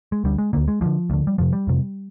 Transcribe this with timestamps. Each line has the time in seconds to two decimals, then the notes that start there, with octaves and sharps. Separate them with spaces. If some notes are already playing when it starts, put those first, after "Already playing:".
0.12 G#3
0.24 D2 D3 G3
0.38 G#3
0.53 D2 D3 A#3
0.68 G#3
0.81 D2 D3 F3
1.10 D2 D3
1.27 G3
1.38 F2 C3 F3
1.53 G3
1.67 F2 C3